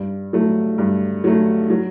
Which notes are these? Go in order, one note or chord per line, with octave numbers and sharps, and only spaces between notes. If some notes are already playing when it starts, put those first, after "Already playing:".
Already playing: G2
F#3 A3
G2
F#3 A3
F#3